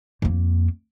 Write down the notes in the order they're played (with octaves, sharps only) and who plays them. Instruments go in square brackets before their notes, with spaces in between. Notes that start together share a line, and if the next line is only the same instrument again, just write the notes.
[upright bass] F2 A#3